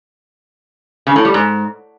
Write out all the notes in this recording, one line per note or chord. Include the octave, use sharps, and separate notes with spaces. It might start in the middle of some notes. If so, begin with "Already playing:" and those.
C#3
A2
G3
G#2